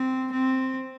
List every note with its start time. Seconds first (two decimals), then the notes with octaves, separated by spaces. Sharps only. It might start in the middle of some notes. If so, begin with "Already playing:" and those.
Already playing: C4
0.32 C4